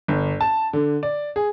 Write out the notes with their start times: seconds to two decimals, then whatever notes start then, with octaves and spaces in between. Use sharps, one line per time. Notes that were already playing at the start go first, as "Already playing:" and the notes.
0.08 G1
0.41 A5
0.73 D3
1.03 D5
1.36 G#4